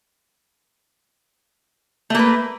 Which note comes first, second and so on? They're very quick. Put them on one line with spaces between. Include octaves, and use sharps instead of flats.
A3 A#3 B4